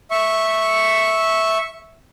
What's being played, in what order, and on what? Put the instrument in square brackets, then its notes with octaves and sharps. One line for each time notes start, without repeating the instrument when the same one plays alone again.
[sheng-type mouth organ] E5 C#6